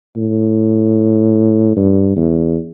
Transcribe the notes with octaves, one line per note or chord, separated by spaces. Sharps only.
A2
G2
E2